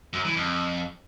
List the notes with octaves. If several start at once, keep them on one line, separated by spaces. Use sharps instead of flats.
F#2
E3
F2